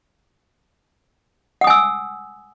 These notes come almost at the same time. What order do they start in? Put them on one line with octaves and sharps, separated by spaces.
F#5 D#6 G#5 E6